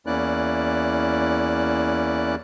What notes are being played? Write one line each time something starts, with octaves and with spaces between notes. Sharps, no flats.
E2 A#3 C#4 E4 D5 F#6